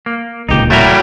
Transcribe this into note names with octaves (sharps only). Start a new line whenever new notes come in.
A#3
D1 C#2 A#2 D#4 G4
F#3 G3 A3 E4 A#4